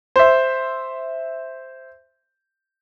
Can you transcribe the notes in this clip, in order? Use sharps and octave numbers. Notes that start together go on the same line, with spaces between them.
C5 E5